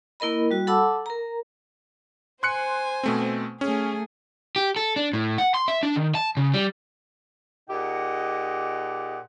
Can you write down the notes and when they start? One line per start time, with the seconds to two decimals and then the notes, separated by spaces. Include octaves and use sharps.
0.20 A#3 E4 A#4 D#5 B5
0.51 G3 F#4
0.67 A4 F#5 A5 B5 D6 E6
1.06 A#4 A#5
2.43 C5 G#5 C6 F#6 C#7
3.03 B2 A3 C4
3.61 A3 C#4 G#4
4.56 G4
4.76 A4
4.96 D4
5.13 A2
5.38 F#5
5.54 C6
5.68 E5
5.83 D4
5.96 D#3
6.15 A5
6.37 C#3
6.54 G3
7.70 A#2 D#4 G4 G#4 D#5 F#5